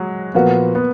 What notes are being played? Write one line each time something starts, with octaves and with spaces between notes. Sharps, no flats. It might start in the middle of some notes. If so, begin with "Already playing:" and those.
Already playing: F#3 G#3
A#2 F3 A#3 B3 F#4
B3